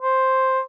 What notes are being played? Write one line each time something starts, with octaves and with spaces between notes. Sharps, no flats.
C5